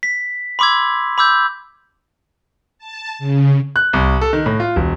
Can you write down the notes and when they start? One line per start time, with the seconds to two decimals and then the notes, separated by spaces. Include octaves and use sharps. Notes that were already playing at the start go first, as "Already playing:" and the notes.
0.03 B6
0.59 B5 C6 D6 E6 G#6
1.18 B5 D6 E6 G6
2.78 A5
3.19 C#3
3.76 F#6
3.93 C2
4.21 A4
4.33 D#3
4.46 A2
4.60 F4
4.76 E1